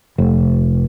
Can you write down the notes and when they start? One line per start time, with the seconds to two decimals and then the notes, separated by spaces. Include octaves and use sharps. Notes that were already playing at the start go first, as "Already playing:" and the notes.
0.18 F1